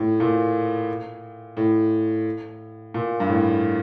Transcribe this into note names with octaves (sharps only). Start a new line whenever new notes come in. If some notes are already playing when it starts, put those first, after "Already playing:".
Already playing: A2
A#2
A2
A#2
G2
A2